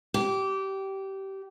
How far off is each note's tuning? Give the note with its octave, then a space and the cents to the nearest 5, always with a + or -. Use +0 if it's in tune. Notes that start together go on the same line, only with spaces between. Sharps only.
G4 -20